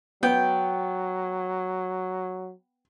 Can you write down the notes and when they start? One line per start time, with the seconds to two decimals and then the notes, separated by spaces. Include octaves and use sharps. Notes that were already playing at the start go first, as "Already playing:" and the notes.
0.23 F#3 B3 G5